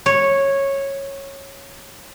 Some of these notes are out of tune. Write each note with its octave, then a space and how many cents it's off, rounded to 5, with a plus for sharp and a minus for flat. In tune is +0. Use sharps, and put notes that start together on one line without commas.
C#5 -10